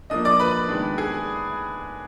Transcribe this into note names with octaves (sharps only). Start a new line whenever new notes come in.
F3 A#3 D4 D#5 D#6
D5 D6
B4 B5
D#3 G#3 B3 D4
G#4 G#5